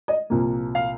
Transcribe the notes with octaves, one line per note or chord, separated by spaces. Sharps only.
D#5
C2 A#2 F3 A#3
F5